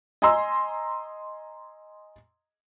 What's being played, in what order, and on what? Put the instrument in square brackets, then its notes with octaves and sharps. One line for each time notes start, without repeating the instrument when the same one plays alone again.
[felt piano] D#5 G#5 A#5 C6 E6